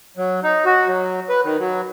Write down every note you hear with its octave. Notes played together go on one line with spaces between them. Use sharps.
F#3
D#4
F#4
F#3
B4
D#3
F#3